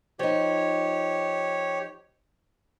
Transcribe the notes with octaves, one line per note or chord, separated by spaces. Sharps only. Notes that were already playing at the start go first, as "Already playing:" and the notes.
F3 D#4 G4 C#5